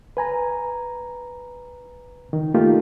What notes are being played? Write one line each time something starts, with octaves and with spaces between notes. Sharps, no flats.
B4 G#5 A#5
D#3
A3 A#3 D#4 F4 G4